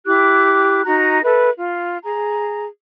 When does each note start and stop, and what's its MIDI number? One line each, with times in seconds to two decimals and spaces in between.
0.06 0.84 64
0.06 0.84 67
0.06 0.84 86
0.06 0.84 90
0.85 1.21 63
0.85 1.21 66
0.85 1.21 82
1.23 1.49 69
1.23 1.49 71
1.23 1.49 76
1.56 1.96 65
2.03 2.65 68
2.03 2.65 82